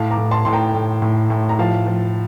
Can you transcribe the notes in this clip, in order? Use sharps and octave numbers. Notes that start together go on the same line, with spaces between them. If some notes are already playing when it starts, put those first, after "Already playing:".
Already playing: A2 F5 A5
A#5 D6
A2
A5 C6
A2 C6
G5 A#5
A2
A2
A2
A#5
F3 F5 A5
F3